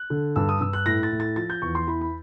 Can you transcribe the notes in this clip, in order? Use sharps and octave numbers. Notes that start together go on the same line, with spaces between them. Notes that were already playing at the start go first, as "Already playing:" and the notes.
Already playing: F#6
D3
G2 E6
D#6
G2 E6
F#6
A2 A#6
A6
A2
A6
F3 A6
G6
E2 C#6
C6
E3 B5
B5